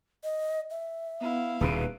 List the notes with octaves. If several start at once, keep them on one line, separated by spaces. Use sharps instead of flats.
D#5
E5
B3 E4 F5
D#1 D#2 B2 G#4 B4